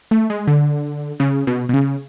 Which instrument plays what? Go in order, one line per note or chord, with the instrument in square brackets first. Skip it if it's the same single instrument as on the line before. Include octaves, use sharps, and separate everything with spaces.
[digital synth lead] A3
G#3
D3
C#3
B2
B2
C#3